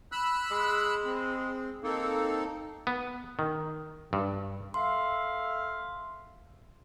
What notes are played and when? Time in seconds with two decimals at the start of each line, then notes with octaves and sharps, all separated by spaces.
0.12 B5 E6 F#6
0.51 G#3
1.05 C4
1.84 A#3 C4 D#4 A4
2.87 B3
3.39 D#3
4.13 G2
4.74 A4 E5 F5 C6